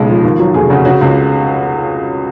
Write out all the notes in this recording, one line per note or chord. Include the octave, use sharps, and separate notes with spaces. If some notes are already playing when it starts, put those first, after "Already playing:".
Already playing: B1 A#2 C#3 G#3
F3
D#2
F#3
F1 G#4
C#3 F#4
C#3 F#4
C#2